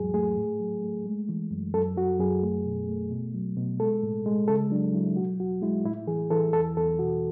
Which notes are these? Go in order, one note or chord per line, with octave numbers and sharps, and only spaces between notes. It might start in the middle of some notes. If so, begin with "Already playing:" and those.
Already playing: E2 G#2 F#3 G#4
A3 G#4
A2
F#3
A3
G#3
E3
F#2
F#2 A4
F#2 F#4
F#2 G#4
A3
B2
A3
B2
F#3
B2
G#3 A4
A2
G#3
C#3 A4
F#3 D4
F#3 E4
B2 F#4
E2 F#4
G#3 E4
A2 E4
E3 G#4
E3 A4
E2 A4
E2 A4
B2 F#4